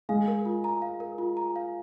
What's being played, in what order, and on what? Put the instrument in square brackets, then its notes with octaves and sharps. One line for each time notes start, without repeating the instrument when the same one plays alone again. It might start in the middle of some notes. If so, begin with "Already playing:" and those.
[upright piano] G#3 [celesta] F5
[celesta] A#4
F4
A#5
F5
A#4
F4
A#5
F5